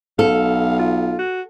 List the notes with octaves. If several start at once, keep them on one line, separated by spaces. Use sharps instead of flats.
B1 A4 F5
F4
F#4